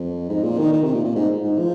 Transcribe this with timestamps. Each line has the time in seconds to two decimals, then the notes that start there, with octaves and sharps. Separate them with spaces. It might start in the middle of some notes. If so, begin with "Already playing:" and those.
Already playing: F2
0.29 G#2
0.44 A#2
0.58 D#3
0.73 D#3
0.84 C3
0.95 A#2
1.05 A#2
1.16 G#2
1.44 G#2
1.59 F3